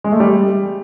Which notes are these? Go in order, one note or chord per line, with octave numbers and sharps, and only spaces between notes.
G#3
A3
G3